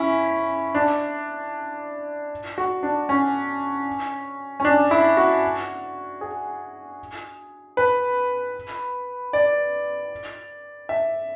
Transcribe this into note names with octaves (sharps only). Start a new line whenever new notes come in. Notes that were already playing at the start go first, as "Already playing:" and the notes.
Already playing: C#4 E4
D4
F#4
D4
C#4
C#4
D4
E4
F#4
G#4
B4
D5
E5